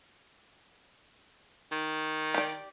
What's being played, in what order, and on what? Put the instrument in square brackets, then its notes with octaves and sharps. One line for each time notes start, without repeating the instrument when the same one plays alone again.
[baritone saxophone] D#3
[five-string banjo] G4 D5